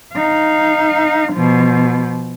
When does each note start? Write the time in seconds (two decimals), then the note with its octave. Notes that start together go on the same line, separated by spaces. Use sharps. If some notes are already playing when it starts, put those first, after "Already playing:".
0.15 D#4 F5
1.33 B2 F3